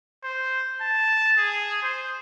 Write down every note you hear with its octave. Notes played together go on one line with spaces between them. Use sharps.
C5
A5
G#4
C5